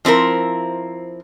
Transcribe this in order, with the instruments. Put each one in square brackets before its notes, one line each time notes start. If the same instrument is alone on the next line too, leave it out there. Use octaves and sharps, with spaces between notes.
[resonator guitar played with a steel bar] F3 C4 E4 A#4